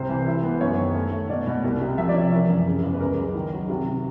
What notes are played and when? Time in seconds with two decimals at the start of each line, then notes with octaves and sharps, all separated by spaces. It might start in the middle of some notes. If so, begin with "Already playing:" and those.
Already playing: C2 C3 C5
0.09 E3
0.27 E4
0.43 B3
0.61 F#2 C#5
0.77 D#3
0.95 A3
1.12 A3
1.29 B2 D5
1.47 B2
1.64 C2
1.81 C3
1.98 F3 E5
2.09 D5
2.14 C3 C#5
2.32 E3 A#4
2.49 F#2
2.66 C#3
2.83 E2
2.93 B4
3.00 C#2 A#4
3.18 F#3
3.35 D#3
3.52 F#3
3.69 C3